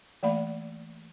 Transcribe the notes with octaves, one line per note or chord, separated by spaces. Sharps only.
E3 A3 A#3 D5 F5 B5